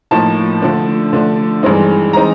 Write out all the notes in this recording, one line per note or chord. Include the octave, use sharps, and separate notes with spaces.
A2 F3 A#3 D#4 A5
D3 F3 A3 D4
D3 F3 A3 D4
G2 E3 G#3 C4 D#4
E3 G#3 C4 D#4 A#5